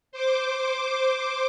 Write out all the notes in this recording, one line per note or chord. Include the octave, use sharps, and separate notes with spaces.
C5 D6